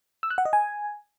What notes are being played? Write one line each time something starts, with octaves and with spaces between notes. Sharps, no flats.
E6
F#6
F#5
D#5
G#5